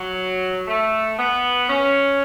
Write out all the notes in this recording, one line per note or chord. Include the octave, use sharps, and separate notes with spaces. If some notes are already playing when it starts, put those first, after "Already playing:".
Already playing: F#3
A3
B3
C#4